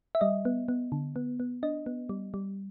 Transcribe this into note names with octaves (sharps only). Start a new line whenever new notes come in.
E5
G3 D#5
B3
B3
D3
B3
B3
D4 D#5
B3
G3
G3